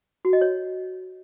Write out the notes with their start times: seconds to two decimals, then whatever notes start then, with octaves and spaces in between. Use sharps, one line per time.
0.25 F#4
0.33 D#5
0.41 C#5